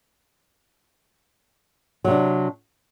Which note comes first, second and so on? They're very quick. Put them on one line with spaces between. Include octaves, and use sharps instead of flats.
F#3 C3 D4